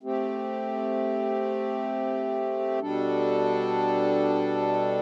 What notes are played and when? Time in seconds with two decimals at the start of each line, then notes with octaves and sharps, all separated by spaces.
0.03 A3 C4 G4
2.80 B2 G3 D4 A4